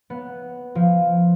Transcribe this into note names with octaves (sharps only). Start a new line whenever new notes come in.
B3
F3